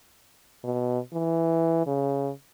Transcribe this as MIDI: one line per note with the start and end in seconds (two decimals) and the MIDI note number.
0.64 0.99 47
1.13 1.86 52
1.87 2.31 49